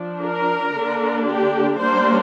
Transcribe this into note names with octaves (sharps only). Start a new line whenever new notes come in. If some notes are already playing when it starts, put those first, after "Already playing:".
Already playing: F3 D4
A#4
D3 A#3 D4
G4
G3 A#3 D4 C5